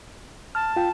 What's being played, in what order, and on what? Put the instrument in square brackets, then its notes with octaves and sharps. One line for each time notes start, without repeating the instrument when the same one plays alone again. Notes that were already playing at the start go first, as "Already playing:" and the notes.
[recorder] A5 [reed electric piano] F6
[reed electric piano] F4 G5